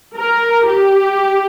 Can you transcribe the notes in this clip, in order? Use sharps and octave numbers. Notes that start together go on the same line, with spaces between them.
A#4
G4